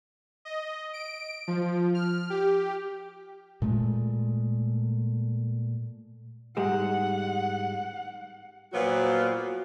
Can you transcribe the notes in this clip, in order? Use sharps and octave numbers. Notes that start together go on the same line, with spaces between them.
D#5
D7
F3
F6
G4
A#2 G#3 A3
G#2 G3 G#3 F#5
A#2 F3 F#3 B3 F#4